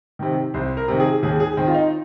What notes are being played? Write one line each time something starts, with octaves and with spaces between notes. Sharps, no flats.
C3 D#3
C2 C5
A#4
C3 D#3
G#4
D#2 G#4
G#4
D#3 C4
F4
D#4